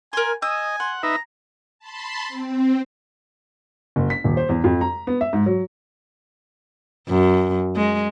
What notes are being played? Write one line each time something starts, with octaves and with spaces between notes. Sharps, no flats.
A#4 G#5 C6
D#5 G#5 D#6 E6
F#5 C6
D#4 B4 E5 A#5
A5 B5 C6
C4
F#1
B6
D#1
C5
E2
F2
A#5
B3
E5
G#2
F#3
F#2
G#3